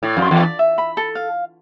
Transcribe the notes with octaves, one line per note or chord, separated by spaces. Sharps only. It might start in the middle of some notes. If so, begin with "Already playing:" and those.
A2 D5
F2
C6
E2
D5
E5
B5
A4
F5